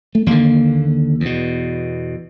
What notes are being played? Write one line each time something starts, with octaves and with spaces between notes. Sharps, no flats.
A3
D#2 D3 A#3
E2
B2